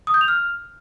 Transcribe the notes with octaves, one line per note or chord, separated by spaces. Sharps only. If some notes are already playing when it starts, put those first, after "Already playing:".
D#6
G6
F7
F6